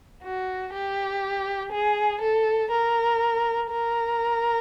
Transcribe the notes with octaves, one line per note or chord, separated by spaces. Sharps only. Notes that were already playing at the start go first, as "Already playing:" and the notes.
F#4
G4
G#4
A4
A#4
A#4